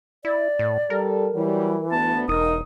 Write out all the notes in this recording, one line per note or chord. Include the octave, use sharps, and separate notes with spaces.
E4 D5
A2
G3 A4 A#4
E3 F#3 G3
D2 B3 A5
E1 D#4 A#4 D#6